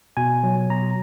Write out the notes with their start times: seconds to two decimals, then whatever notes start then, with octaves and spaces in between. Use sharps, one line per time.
0.17 B2 G#5
0.43 F#3
0.70 B2 A#5